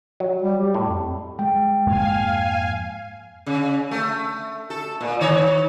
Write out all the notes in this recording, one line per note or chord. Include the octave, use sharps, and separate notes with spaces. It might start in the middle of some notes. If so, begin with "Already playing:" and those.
F#3
G3
G4
A2
F2
G#3 G5
F2 G#2 A#3 F5 G#5
C#3
A3
A4
A#2
D#3 C#5